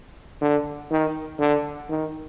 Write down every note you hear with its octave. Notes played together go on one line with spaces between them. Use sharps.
D3
D#3
D3
D#3